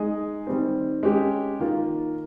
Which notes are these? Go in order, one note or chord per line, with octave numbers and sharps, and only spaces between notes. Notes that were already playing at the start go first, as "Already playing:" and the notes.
Already playing: G#3 D#4 G#4 D#5
D#3 G3 C4
G#3 C#4 G4
D#3 A#3 F4